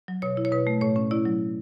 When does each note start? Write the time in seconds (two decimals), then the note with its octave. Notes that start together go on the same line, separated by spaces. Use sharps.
0.08 F#3
0.22 B2 C#5
0.37 E4
0.45 C#5
0.52 B2 B4
0.67 A3
0.81 A2 C#5
0.96 C#4
1.11 E4 D5
1.26 F#3